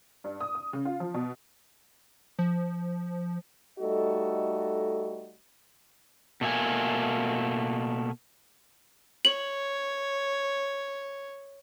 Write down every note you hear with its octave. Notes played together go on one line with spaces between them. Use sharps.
G2
D#6
D#6
C#3
F4
F3
B2
F3
G3 A3 D#4 F#4 A4 D#5
B2 A3 A#3 G#5
C#5 F#7